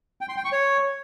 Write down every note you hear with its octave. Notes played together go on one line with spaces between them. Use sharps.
G5
C6
G5
C#6
C#5